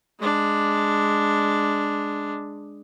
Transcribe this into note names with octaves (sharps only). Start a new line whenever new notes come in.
G#3 D4